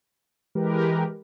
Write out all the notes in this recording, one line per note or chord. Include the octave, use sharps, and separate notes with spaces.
E3 G#3 G4 A#4 B4